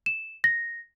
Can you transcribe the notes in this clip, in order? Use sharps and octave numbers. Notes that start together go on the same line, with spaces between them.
E7
A#6